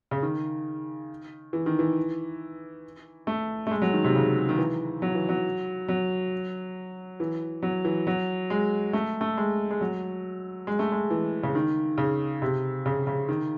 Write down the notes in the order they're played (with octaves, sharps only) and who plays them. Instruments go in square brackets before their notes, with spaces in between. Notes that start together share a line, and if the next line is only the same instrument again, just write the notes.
[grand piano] C#3
D#3
E3
D#3
E3
A3
A3
G#3
F#3
D#3
C3
D#3
C#3
D#3
E3
F#3
E3
F#3
F#3
E3
F#3
E3
F#3
G#3
A3
A3
G#3
G#3
F#3
G#3
A3
G#3
E3
C#3
D#3
C#3
C3
C#3
C#3
D#3